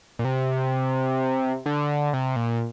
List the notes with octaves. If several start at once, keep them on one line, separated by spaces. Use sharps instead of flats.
A#2
C3
D3
C3
A#2